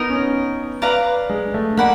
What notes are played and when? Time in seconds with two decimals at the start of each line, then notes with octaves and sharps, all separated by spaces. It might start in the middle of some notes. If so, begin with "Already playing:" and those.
Already playing: B3 D#4 A#4 D#5
0.10 C#4
0.82 B4 D5 F5 A#5
1.30 G#3
1.54 A3
1.77 A#3 D5 F#5 B5